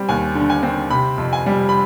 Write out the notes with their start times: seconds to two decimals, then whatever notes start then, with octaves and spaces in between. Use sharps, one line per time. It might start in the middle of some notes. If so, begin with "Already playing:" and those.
Already playing: G3 C4
0.09 D#2 G#5
0.35 D3
0.50 G#5
0.63 C4
0.90 C3 B5
1.18 F2
1.33 G#5
1.46 G3
1.69 B5